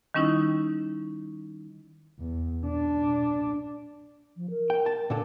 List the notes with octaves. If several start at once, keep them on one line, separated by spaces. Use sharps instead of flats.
D#3 G3 C#4 D#4 E4
E2
D4
F3
A#4
G5
A5
A#2 D3 A4